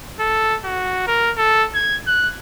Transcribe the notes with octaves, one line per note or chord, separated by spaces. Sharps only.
A4
F#4
A#4
A4
G#6
F#6